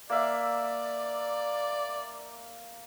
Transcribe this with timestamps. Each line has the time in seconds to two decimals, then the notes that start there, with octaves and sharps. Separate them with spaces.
0.10 A#3 D5 E5